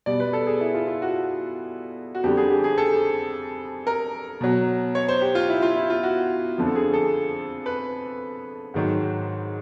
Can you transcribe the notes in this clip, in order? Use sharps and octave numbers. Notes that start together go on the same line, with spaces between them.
B2 G3 D5
B4
A4
G#4
E4
F4
F4
F#4
F#4
F2 D3 G3 G4
G#4
G4
G#4
A4
A#4
B2 F#3
C#5
C5
G4
F4
E4
F4
E4
F4
F#4
F2 D3 F3
A4
G#4
A4
B4
G#2 D#3 F#3